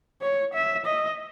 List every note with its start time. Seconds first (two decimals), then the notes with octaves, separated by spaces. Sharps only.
0.22 C#5
0.54 E5
0.86 D#5